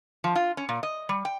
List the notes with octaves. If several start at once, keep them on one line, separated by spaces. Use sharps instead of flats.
F3
F4
C#4
A#2
D#5
G3
G5